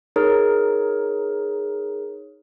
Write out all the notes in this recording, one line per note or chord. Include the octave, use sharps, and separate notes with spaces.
D#4 G#4 A#4 C#5